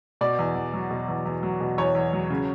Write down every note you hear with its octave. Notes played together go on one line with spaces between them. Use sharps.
B2 D5
E2
E2
F#3
B2
E2
E2
F#3
B2
E2 C#5
E2
F#3
C#3